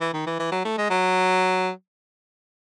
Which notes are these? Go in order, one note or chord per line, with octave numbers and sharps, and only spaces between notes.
E3
D#3
E3
E3
F#3
A3
G#3
F#3